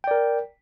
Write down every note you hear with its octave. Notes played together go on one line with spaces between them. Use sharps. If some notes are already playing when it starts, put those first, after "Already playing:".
A#4 D5 G5